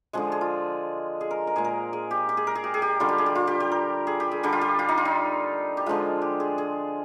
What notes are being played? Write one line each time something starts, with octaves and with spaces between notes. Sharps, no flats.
D3 F3 G#3 G#4
G#4
F4
G#4
A#4
A#4
A#2 G#3 G#4
A#4
G#4
G4
G4
G#4
A#4
G#4
G4
G#4
G4
D3 G3 F4
G4
G#4
G4
F4
G4
G4
A#4
G#4
G4
G#4
D3 G3 G4
F4
G4
F4
D#4
F4
D#4
G4
D3 F3 G#3 F4
G4
G#4
G#4